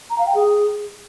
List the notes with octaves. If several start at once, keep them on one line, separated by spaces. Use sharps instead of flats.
A#5
F5
G5
G#4